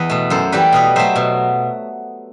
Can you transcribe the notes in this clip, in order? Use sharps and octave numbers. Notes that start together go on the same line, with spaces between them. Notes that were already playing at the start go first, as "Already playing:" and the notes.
Already playing: E2 B4 D#5
B2 A3
F#2 A4 C5
E3 G3 G4 B4
B2 B4 D#5
F#3 A3 C5 E5
B2